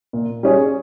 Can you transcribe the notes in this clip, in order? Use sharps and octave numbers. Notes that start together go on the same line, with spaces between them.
A#2
G3 C#4 G#4 C#5